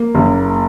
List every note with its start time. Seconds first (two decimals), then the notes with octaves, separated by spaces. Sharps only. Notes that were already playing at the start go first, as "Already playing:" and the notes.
Already playing: A#3
0.15 F#1